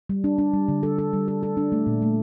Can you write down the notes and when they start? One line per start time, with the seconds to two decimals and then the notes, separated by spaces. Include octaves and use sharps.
0.09 G3
0.24 D4
0.38 D4
0.53 G3
0.68 D3
0.83 A4
0.98 A4
1.13 G3
1.28 A4
1.43 A4
1.57 D4
1.72 A3
1.87 A#2
2.02 A3